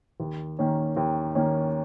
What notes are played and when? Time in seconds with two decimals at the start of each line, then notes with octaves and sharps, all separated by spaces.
0.20 D#2
0.59 D#3 A#3 C#4
0.97 D#2
1.35 D#3 A#3 C#4